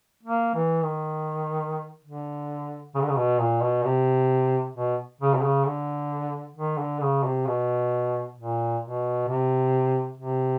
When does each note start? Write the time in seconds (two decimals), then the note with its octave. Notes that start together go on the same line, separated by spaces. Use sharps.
0.23 A#3
0.54 E3
0.84 D#3
2.04 D3
2.95 C#3
3.01 D3
3.09 C#3
3.17 B2
3.40 A#2
3.62 B2
3.85 C3
4.75 B2
5.21 C#3
5.34 C3
5.43 C#3
5.66 D3
6.56 D#3
6.78 D3
7.02 C#3
7.24 C3
7.46 B2
8.37 A#2
8.82 B2
9.28 C3
10.17 C3